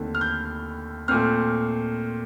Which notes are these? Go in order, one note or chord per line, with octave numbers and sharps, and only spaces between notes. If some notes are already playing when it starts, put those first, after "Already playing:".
Already playing: D#2 D3 A3 C4
F6
G6
A#2 A3 C4 F6